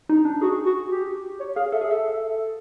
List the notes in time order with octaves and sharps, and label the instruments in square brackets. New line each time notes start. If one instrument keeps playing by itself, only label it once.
[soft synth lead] D#4
D4
[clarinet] F#4 [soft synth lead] G#4
[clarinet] F#4
G4
C#5
[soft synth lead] G#4 [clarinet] F5
[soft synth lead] A4 [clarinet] E5
[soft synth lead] G#4
[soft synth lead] A4 [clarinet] E5